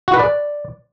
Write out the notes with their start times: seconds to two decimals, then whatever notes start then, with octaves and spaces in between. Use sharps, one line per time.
0.08 F#4
0.14 B4
0.19 D5